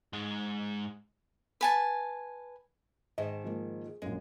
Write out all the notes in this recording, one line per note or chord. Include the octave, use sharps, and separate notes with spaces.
G#2 G#3
B4 G#5 A5
G#2 D#3 D#5 A5
F3 G#3 A#3
G#4
A#1 F#2 G#3